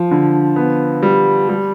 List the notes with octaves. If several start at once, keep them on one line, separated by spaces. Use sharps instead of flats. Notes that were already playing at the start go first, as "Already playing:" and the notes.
Already playing: F3
D3
B3
G3
G3